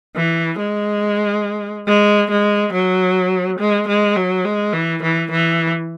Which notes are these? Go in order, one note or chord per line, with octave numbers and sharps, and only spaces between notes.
E3
G#3
G#3
G#3
F#3
G#3
G#3
F#3
G#3
E3
E3
E3